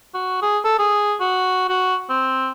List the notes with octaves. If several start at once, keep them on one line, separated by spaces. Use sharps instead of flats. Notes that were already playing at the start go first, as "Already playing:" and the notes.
F#4
G#4
A4
G#4
F#4
F#4
C4